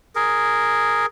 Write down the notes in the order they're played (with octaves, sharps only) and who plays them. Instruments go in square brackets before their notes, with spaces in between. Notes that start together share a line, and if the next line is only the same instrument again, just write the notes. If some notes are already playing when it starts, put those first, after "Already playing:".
[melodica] G#4 A#4